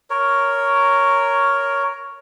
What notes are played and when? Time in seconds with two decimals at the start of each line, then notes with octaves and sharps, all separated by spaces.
0.10 A#4 C#5